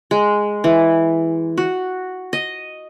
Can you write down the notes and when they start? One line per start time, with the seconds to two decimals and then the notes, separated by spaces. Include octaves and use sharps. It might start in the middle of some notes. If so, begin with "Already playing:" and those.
0.11 G#3
0.64 E3
1.57 F#4
2.33 D#5